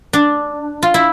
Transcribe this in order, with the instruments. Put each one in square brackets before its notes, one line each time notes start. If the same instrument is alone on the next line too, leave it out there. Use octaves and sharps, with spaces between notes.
[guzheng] D4
F4
E4